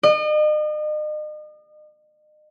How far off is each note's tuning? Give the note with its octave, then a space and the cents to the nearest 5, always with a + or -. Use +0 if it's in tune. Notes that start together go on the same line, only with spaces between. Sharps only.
D#5 -40